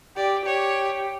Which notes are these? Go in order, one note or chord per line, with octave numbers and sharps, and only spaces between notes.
G4 D5
G4 C#5